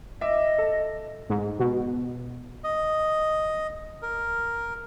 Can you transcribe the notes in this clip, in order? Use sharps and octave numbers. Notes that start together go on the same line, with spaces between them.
D#5 E5 D6
A4
G#2
B2
D#5
A#4